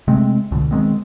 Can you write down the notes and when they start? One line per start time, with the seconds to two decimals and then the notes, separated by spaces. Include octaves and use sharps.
0.08 C3 G#3 A3 C4
0.51 C#2 B2 D3
0.71 D#3 G#3 B3 C4